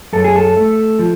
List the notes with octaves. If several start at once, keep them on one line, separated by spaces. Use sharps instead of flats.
F#2 A4
G#4
A4
A3
F3